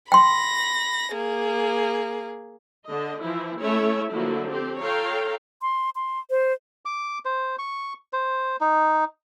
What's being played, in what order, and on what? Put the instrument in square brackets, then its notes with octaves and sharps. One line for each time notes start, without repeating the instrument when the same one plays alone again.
[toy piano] G5 C6 [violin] B5 A#6
[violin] A#3 G#4
[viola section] D3 D#5
E3 F3 E4
A3 C#4 E4 C#5 E5
D3 F3 F#3 A#3 E4
C4 G4 A4
F4 A4 C#5 F5 G5 A#5
[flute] C6
C6
C5
[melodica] D6
C5
C#6
C5
D#4